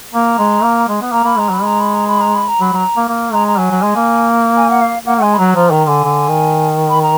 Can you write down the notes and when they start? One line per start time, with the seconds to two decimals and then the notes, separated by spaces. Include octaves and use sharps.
0.14 A#3 A#5
0.39 G#3
0.63 A#3
0.88 G#3
1.02 B3
1.12 A#3 A#5
1.24 A#3 B5
1.37 G#3 A#5
1.49 F#3 B5
1.62 G#3 A#5
1.80 B5
1.94 A#5
2.08 B5
2.21 A#5
2.35 B5
2.48 A#5
2.60 F#3 B5
2.73 F#3 A#5
2.97 A#3
3.09 A#3
3.33 G#3 A#5
3.48 A#5
3.58 F#3 G#5
3.71 F#3
3.82 G#3
3.96 A#3
4.57 G#5
4.70 F#5
4.81 F5
5.05 A#3 F#5
5.17 F#5
5.22 G#3 G#5
5.34 B5
5.39 F#3 A#5
5.55 F3 A#5
5.71 D#3 A#5
5.88 D3 G#5
6.04 D3
6.28 D#3
6.89 B5
7.02 A#5